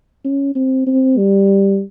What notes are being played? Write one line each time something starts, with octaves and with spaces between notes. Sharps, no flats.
C#4
C4
C4
G3